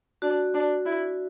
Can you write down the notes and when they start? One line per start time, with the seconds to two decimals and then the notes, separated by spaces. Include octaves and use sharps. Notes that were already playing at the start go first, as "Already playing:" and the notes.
0.22 D4 F#4
0.54 D4
0.86 E4